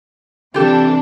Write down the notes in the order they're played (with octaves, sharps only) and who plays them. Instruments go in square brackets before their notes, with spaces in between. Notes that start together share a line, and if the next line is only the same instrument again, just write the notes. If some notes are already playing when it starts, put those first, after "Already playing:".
[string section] C3 E3 D4 [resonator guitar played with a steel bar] F4 G4 A4